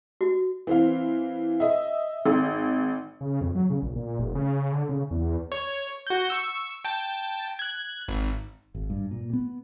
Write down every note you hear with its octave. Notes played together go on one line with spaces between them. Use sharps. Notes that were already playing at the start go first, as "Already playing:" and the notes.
F#4
E3 C4 F5
D#5 E5
G#1
C#3
F2
F#3
C#3
A#1
A#2
F1
C#3
D3
C#3
E2
C#5
F#4 G6
C#6 E6
G5 A5 A6
F#6 G#6
G#1
G#1
G2
A#2
B3